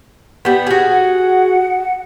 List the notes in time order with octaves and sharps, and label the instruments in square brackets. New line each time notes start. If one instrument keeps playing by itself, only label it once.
[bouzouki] G3 B3
F#4 G#4
[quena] F#5